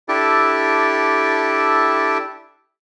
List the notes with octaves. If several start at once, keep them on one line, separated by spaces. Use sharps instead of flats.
D4 E4 G4 A4